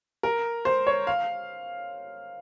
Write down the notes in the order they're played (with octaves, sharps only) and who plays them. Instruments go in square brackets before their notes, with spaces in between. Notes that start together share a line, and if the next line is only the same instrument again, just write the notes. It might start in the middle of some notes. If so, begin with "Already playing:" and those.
[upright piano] A#4
C5
C#5
F5